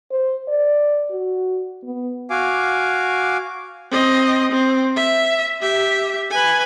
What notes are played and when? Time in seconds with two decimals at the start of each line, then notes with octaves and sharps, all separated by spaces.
0.11 C5
0.48 D5
1.10 F#4
1.83 B3
2.30 F#4 F5 G#5 D6
3.91 C4 D#5
4.52 C4
4.97 E5
5.60 G4 E5
6.31 B4 G#5